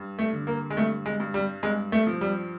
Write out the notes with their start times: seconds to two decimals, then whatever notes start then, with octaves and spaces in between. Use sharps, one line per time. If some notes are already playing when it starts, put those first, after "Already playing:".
Already playing: G2
0.19 A3
0.33 D3
0.47 A#3
0.70 G#3
0.77 G2 A3
1.06 G#3
1.20 G2
1.34 G3
1.63 G2 G#3
1.92 A3
2.07 F3
2.21 G3